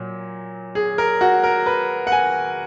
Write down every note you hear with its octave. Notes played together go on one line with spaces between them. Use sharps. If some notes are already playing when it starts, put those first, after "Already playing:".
Already playing: A#2 F#3
G#4
A#4
F#4
A#4
B4
F#5
G#5